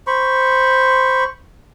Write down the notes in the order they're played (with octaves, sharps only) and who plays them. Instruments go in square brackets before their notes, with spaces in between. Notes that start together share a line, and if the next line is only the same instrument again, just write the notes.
[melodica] C5 B5 C#6